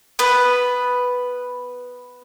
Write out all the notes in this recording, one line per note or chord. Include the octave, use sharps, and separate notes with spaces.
B3 B4